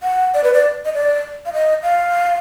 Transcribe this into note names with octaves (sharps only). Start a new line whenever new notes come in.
F#5
D5
B4
D5
D#5
D5
F5
D#5
F5